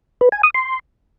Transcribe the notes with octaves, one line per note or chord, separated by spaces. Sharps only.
B4
G#5
D#6
C6